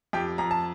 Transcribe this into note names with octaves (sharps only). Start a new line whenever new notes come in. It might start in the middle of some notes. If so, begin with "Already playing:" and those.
F2 G4 G5
F2 A#5
A5